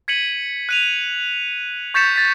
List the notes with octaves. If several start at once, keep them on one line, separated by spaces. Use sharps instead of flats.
G#6 B6 C#7 D#7 F#7
F#6 D#7 F7
C#6 G6 A6 B6 C#7 E7
A6 B6